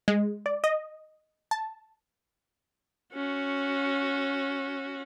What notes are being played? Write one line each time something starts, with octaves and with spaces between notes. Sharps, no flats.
G#3
D5
D#5
A5
C#4 F#4